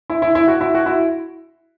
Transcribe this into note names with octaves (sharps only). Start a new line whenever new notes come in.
E4
E4
E4
F#4
E4
F#4
E4